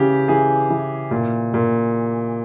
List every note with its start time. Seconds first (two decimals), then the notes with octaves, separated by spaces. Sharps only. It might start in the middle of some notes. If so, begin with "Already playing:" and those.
Already playing: C#3 E3 G4
0.28 E3 G#4
0.70 E3
1.11 A#2
1.54 A#2